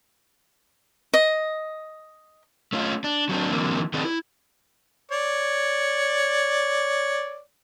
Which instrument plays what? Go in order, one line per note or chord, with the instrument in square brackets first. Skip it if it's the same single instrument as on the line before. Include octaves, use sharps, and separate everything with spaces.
[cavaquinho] D#5
[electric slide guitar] A3 C#4 F4
D4
F#3 C4 D4
D3 E3 F#3 A#3 C4
D#3 C4 G#4 A4 B4 D5
E4
[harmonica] C#5 D5